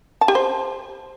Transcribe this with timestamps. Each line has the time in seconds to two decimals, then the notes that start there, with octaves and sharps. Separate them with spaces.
0.21 A5
0.28 G4
0.35 C5